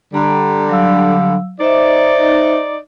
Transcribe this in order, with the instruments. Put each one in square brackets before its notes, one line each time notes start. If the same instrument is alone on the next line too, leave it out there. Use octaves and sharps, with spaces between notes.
[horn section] D3 G3 [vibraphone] A#5
[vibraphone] F#3 F5 E6
[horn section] D#4 D5 [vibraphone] C5 E5